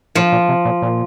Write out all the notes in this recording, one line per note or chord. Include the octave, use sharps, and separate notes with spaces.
A2 F3
A#2
C3
A#2
A#2